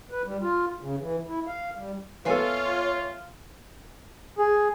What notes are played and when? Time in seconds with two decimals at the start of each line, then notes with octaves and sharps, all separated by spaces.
0.11 B4
0.26 G3
0.42 F4
0.81 C#3
1.00 E3
1.27 E4
1.47 F5
1.77 G3
2.25 B3 F4 A4 C#5 E5 F5 G#5
4.39 G#4